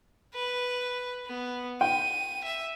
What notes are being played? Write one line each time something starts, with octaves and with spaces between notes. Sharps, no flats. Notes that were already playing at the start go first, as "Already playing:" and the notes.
B4
B3
G5 D#7
E5